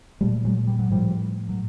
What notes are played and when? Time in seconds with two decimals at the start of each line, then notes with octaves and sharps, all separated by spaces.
0.21 A#2 G3 A3
0.44 F#3 G#3
0.67 G3
0.79 F#3
0.90 A2 F3 G3
1.49 F#3